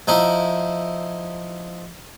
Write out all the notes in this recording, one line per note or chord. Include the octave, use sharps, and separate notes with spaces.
F3 D#4 E4